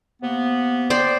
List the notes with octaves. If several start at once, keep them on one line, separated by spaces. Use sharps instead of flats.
C3 A#3 B3
C5 D5 G5